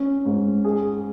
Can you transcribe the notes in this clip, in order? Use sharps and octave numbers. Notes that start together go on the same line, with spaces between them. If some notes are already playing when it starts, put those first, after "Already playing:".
Already playing: C#4
G#2
G#4